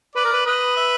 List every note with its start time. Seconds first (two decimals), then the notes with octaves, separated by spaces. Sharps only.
0.15 B4 D5
0.25 A#4
0.33 B4
0.46 B4 D#5
0.77 E5